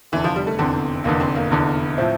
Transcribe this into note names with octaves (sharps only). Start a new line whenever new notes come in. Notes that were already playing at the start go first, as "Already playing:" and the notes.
F1 E2 D3 E3
F3
G3
A3
F1 E2 D3 C4
F1 E2 D3 A#3
C4
A#3
F1 E2 D3
A2 F3 C4 E4